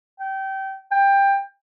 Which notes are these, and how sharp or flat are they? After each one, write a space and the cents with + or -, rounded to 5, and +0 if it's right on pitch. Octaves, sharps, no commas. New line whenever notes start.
G5 -25
G5 +15